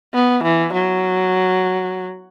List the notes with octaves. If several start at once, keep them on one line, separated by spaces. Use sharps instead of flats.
B3
E3
F#3